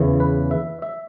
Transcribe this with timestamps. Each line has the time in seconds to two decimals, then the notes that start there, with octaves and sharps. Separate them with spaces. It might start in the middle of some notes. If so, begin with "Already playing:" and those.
Already playing: E2 C#3 E3
0.20 B4
0.51 E5
0.82 E5